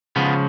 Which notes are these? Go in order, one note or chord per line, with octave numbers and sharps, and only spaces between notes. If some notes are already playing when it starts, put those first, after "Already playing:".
C#2 C#3 F3 B3